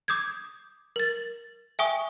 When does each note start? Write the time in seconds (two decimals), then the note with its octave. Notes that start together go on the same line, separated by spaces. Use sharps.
0.08 D6 D#6 G6 G#6
0.96 A#4 A6
1.79 E5 G5 G#5 C#6 D#6